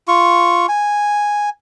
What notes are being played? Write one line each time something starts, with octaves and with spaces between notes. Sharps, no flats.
F4 C#6
G#5